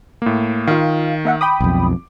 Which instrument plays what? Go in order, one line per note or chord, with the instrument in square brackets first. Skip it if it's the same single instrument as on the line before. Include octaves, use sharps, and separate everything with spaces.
[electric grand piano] A2 A#3
[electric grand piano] D#3 [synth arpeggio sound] F4 F5
[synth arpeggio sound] A#3 E5 F#5
[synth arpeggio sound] G5 B5 D#6 [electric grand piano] D6
[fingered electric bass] B1 F2